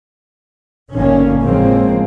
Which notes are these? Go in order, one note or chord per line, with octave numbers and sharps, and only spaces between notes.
G#1 B2 D3 D#3 A#3 C#4
A2 C#3 F3 G#3 A#3 C4